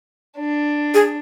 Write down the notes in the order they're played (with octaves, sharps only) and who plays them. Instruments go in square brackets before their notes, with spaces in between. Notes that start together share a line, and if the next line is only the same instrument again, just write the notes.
[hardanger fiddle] D4
[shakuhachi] G#4